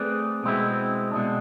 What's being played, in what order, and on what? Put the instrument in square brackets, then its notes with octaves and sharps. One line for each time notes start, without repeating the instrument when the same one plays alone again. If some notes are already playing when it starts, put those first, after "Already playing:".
Already playing: [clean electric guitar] A3 C4 G#4 B4 D5
B2 G#3 C4 E4
B2 G#3 D4